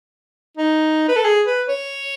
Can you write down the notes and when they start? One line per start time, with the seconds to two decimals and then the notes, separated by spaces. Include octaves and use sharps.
0.57 D#4
1.08 B4
1.16 A4
1.25 G#4
1.47 B4
1.68 C#5